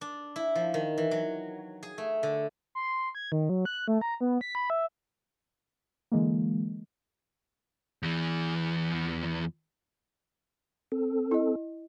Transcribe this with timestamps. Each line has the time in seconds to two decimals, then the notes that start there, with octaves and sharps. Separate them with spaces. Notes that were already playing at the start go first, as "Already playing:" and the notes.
0.01 D4
0.36 E4
0.55 F3
0.74 D#3
0.98 E3
1.11 F#3
1.83 G#4
1.98 A3
2.23 D3
2.75 C6
3.15 G#6
3.32 D#3
3.49 F#3
3.65 F#6
3.88 A3
4.01 A#5
4.21 B3
4.41 B6
4.55 B5
4.70 E5
6.12 D3 E3 G#3 A#3
8.03 E2 E3
10.92 C4 A4
11.31 E4 D#5